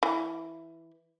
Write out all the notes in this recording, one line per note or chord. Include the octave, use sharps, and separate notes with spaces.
E3